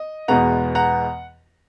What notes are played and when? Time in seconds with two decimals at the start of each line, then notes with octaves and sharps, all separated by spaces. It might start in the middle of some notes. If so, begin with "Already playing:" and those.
Already playing: D#5
0.28 E2 B2 G#3 B3 F#5 A#5
0.75 F#5 A#5